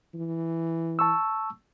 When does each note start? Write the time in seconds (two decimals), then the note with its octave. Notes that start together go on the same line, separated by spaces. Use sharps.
0.14 E3
0.99 A5 C#6 E6